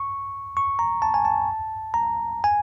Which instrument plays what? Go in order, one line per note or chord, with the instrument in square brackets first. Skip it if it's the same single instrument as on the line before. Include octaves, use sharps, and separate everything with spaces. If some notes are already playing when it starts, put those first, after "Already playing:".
Already playing: [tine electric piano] C#6
C#6
A#5
A5
G#5
A5
A#5
G#5